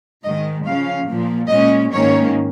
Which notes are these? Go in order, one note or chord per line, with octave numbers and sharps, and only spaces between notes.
G#2 D#3 G#3 D#5
C#3 F3 C#4 F5
A#2 F3 A#3
A#2 G#3 C#4 D#5
G#2 D#3 A#3 C#4 C#5